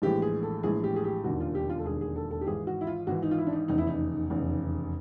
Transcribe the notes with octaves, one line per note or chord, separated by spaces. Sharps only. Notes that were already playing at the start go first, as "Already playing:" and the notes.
A#1 A2 E3 G#3 G4
G#4
A4
A#1 A2 E3 G#3 G#4
G4
G#4
G4
E1 D#2 D3 F#4
F4
G4
F4
A4
E1 D#2 D3 G#4
G#4
A4
A4
G4
G#1 G#2 E3 G#4
F#4
E4
F4
G#1 G#2 E3 F#4
D#4
F4
E4
D4
D#4
F1 E2 C#3 D#4
E4
D#4
F1 E2 C#3